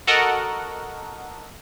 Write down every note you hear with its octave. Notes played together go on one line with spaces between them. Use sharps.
F#4 A4 A#4 D#5 F#5